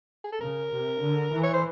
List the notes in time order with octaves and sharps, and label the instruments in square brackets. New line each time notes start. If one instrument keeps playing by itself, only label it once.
[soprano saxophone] G#4
A4
[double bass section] C#3 [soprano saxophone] A#4
[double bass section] C3
D3
E3
[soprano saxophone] C#5
C5